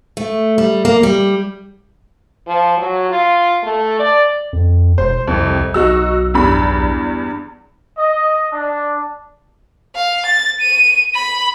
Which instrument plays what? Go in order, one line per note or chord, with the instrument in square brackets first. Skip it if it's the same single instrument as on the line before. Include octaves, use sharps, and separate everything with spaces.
[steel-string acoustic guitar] A3
G3
A#3
G3
[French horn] F3
F#3
F4
A3
D5
[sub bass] F2
[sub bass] E1 [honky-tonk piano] C5
[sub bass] C2 [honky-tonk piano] F2 C3
[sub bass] B1 [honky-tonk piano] D#4 F#4 E6
[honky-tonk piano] E2 G2 B5
[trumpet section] D#5
D4
[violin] F5
A6
D#7
B5